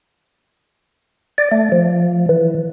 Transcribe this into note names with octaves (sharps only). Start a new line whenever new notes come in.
D5
A3
F3
E3